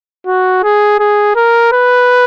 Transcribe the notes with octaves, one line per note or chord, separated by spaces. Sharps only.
F#4
G#4
G#4
A#4
B4